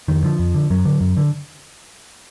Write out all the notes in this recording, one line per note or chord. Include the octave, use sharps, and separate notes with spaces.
F2 D#3
D3 F3
F2
D3
F#2 F#3
D3
F#2
D3